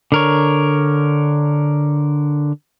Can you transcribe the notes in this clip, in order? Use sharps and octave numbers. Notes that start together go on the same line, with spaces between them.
D3 A#4 C#5